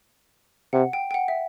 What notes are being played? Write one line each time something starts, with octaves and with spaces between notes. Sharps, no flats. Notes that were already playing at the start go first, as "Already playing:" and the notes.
C3 F#5
G5
G5
F#5
E5